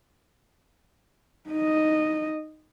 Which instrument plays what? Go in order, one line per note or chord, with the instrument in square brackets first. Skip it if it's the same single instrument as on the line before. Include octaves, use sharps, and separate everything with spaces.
[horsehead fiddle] D#4 D#5